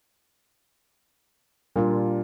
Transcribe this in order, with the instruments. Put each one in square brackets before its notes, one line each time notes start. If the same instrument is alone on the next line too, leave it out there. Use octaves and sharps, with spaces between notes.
[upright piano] A#2 [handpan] G3 D4 F4